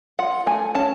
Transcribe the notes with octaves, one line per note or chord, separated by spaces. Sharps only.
F4 F#5
A3 G#5
C#4 A5